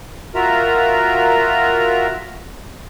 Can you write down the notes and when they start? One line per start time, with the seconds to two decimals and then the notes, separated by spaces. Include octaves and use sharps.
0.35 F4 F#4 A#4 E5 A#5